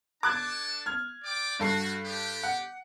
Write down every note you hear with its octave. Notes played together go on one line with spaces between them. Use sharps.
D4 A4 A5 D6 F#6 G#6
F6 G#6
D5 G5 D6
G2 F#4 A4 C7
D4 G4
F#5